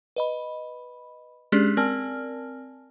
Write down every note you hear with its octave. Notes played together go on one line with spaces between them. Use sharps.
B4 D#5 B5
G#3 C#4 D4 G4 G#4 D5
C4 A#4 D5 G#5 A5 F6